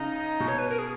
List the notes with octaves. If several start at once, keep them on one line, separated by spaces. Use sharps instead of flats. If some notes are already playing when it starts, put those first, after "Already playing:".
Already playing: C#3 D#4
B2
C#5
B4
A#4
G#4